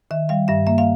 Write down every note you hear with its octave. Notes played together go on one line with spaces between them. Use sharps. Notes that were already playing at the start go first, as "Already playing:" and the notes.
D#3 E5
G3 F5
G2 E5
A#3 E5
F5